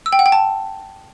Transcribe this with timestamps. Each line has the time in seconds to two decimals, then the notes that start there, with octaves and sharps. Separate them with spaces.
0.06 E6
0.13 G5
0.19 F#5
0.26 G5
0.32 A5